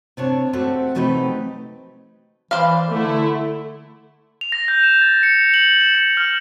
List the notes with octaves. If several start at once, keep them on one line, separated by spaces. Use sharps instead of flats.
C3 D4 C#5 A5
A3 C4 F#4 G4 A4
C3 F#3 A3 D#4 G4 B4
E3 C5 D5 F5
D3 A3 E4
F7
A#6
G6
E7
A6
C#7
F#7
E7
C#7
F6